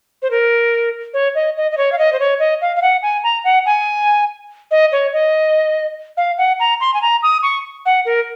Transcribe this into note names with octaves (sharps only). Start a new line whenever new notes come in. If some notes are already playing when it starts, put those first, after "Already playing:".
C5
A#4
C#5
D#5
D#5
D#5
C#5
F5
D#5
C5
C#5
D#5
F5
F5
F#5
G#5
A#5
F#5
G#5
D#5
C#5
D#5
F5
F#5
A#5
C6
G#5
A#5
D#6
C#6
F#5
A#4